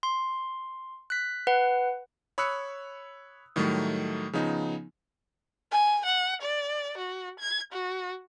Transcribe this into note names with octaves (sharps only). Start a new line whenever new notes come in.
C6
F#6 B6
B4 F#5
C#5 B5 D#6 E6 F#6 C#7
A2 D#3 F#3 G3 A3
C#3 F3 B3 D#4
G#5
F#5
D5
F#4
G#6
F#4